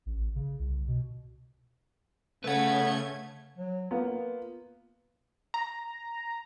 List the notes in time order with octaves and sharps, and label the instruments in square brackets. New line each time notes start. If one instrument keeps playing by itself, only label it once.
[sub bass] A1
C#3
C2
B2
[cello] C#3 [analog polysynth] A3 G#6 [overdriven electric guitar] B4 F#5
[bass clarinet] F#3
[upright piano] A#3 B3 [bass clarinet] F4
[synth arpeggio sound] A#5